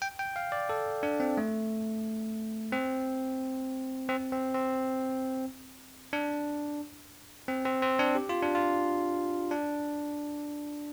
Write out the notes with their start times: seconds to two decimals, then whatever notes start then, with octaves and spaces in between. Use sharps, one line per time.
0.02 G5
0.19 G5
0.36 F5
0.52 D5
0.69 A4
1.03 D4
1.20 C4
1.37 A3
2.72 C4
4.09 C4
4.32 C4
4.54 C4
6.13 D4
7.48 C4
7.66 C4
7.82 C4
7.99 D4
8.15 G4
8.29 F4
8.42 D4
8.55 F4
9.51 D4